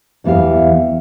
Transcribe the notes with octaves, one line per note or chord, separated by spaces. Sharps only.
E2 E3 B3 G4 F5